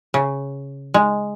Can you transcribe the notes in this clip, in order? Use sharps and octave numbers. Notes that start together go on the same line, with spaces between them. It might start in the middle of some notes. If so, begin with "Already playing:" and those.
C#3
G#3